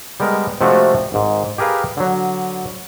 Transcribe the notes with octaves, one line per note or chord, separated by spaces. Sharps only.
G3 G#3 B3 A#4
C3 F3 G#3 A3 D4 F#4
G#1 G#2
G4 G#4 A#4 B4 F5
D3 F#3